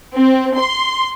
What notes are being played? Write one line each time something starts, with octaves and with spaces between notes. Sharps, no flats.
C4
C6